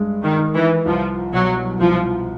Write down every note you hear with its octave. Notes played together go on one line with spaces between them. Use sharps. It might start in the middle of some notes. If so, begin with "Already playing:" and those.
Already playing: G2 G#3
D#3
D#3
E3
C2 F3
B2 F#3
C2 F3